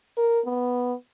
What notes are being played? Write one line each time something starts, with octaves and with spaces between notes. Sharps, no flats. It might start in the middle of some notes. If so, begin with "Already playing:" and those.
A#4
B3